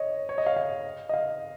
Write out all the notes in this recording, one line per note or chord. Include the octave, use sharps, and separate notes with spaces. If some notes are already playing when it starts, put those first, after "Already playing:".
Already playing: C#5 D#5
C#5
D#5
F5
F5
D#5
F5